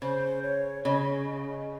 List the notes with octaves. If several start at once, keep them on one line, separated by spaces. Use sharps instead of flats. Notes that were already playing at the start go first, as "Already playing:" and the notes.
C#3 C5
C#5
C#3 D#5